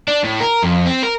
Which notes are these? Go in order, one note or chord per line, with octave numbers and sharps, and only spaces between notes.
D4
A2
A#4
F2
C4
A#4